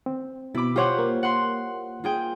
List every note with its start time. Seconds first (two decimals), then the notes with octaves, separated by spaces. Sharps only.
0.06 C4
0.55 B2 E4 B5 D6
0.76 F4 G4 C5 C#5 F#5
0.98 A#3
1.23 F#5 C6
2.04 F4 G#4 G5